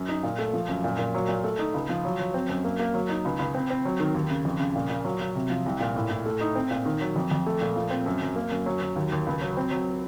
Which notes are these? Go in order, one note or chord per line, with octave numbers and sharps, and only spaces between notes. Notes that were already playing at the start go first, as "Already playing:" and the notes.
Already playing: F#2
D#4
A#2
A3
F3
F#2
A#2
A#2
F#3
A#2
A3
D#4
C#2
F3
F#3
F#3
C4
F#2
A#3
A#3
F#3
D#4
C#2
C#2
C4
C4
F#3
D#3
D#2
C#3
F2
C#3
A#2
A#2
F#3
F#3
C3
F3
C2
A#2
A2
A2
A3
D#4
C4
A#2
D#3
F#3
F2
F2
A3
A#2
F3
C4
F#2
F#2
A#3
F#2
F#3
F#3
D#2
D#2
C#2
F#3
C4
F#3